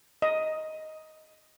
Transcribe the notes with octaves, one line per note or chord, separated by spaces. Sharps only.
D#5